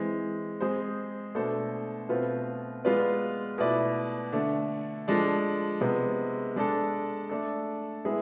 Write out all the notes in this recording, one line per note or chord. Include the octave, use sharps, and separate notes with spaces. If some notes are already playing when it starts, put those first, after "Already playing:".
Already playing: E3 G#3 C4
G#3 C4 G#4 C5
B2 A3 D4 A4 C5
B2 A3 C4 F4 B4
G#3 B3 F4 B4 D5
B2 A3 E4 B4 D5
D3 A3 D4
F3 G#3 D4 A4
C3 G#3 B3
G#3 D4 A4
A3 D4 A4
G#3 B3 E4 G#4